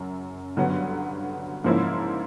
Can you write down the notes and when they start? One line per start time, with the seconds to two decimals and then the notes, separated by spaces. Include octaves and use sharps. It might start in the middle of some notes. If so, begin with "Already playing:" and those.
Already playing: F#2 C#3
0.57 G2 D3 F#3 B3
1.64 G#2 F3 A#3 C#4 E4